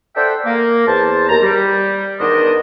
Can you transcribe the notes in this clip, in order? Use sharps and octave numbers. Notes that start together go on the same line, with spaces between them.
A4 C5 D5 E5 F#5 G5
A#3
E2 C5 A5
D#2 A#5
G3
E2 D#3 B3 D4 C5 D#5